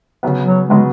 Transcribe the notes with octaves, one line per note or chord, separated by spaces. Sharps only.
C#3 F#3 B3
F#3
C#3 F#3 G#3 B3